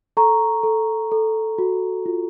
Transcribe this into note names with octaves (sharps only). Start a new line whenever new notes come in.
A4 A#5 C#6
A4
A4
F#4
F4